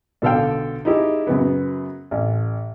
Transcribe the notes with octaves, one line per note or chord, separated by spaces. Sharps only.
B1 D3 A4 F5 G5
D#4 E4 G4 G#4
F#2 C#3 B3
A1